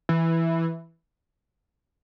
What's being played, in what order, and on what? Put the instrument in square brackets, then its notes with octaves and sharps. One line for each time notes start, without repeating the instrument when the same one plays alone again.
[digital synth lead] E3